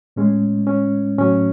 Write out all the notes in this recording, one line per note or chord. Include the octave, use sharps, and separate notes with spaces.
A2 G#3 C#4
C#4
A2 F#3 C#4